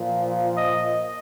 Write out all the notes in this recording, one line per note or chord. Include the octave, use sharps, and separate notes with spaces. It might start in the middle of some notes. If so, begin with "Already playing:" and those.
Already playing: A#2 F3
D#5